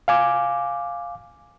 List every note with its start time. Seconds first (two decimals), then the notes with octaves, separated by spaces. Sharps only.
0.08 F5 G#5 D6